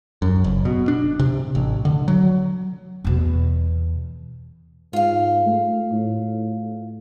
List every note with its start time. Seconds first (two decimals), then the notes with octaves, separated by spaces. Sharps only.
0.22 F#2
0.44 F#1
0.65 B2
0.88 D4
1.19 C3
1.55 A1
1.85 D3
2.08 F#3
3.04 E2 B2
4.93 G#2 F4 F5
5.46 A3
5.92 A2